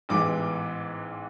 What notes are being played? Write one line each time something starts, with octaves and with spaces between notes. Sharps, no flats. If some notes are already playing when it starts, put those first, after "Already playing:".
A1 G#2 E3 B3 D6